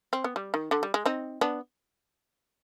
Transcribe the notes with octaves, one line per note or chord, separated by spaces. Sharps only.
C4
B3
G3
D#3
D3
G3
G#3
C4 D#4
B3 D4